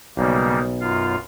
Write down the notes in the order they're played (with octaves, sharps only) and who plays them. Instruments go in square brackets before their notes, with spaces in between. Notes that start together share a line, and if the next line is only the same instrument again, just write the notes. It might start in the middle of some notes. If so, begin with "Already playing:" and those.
[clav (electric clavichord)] B1 [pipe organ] C#3 G3 A#3
[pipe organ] F#2 F4 F5